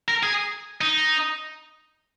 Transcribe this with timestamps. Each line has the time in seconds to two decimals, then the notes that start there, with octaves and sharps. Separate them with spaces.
0.08 A#4
0.23 G#4
0.81 D#4